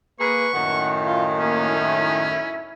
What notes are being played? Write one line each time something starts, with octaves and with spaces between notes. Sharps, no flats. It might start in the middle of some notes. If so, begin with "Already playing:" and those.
A#3 G#4 B4 C#6
F#2 A2 D#3 F#5
F4
A#3 C#4
E4